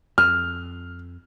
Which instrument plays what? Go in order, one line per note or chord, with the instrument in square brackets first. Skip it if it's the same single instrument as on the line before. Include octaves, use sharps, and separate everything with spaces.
[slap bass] F2 [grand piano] F6